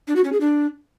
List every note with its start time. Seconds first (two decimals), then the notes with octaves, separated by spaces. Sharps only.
0.08 D4
0.16 F#4
0.24 C#4
0.32 G#4
0.41 D4